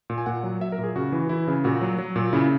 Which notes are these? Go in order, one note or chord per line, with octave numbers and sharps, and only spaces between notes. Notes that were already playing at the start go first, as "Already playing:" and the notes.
A#2
G#5
A#2 F#5
F#3
F#3 E5
A#4
A#2
G#4
C#3 F#4
E3
E3 E4
C#3
A#2 F#4
F#3
F#3
A#2
C#3 E4